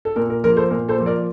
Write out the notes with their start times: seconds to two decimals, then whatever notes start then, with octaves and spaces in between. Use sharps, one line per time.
0.05 A4
0.16 A#2 A#4
0.30 A#4
0.44 F3 A#3 A#4
0.56 A4 C5
0.70 A#2 A#4
0.89 A4 C5
0.98 F3 A#3
1.06 A#4 D5